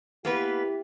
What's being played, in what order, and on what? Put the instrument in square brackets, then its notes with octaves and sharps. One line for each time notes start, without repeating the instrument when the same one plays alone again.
[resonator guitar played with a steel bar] A#3 B3 B4 [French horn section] E4 G4